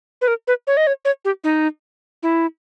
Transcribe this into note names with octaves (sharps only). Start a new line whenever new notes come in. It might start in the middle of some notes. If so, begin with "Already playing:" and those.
B4
A#4
B4
C#5
D#5
C#5
C#5
G4
D#4
E4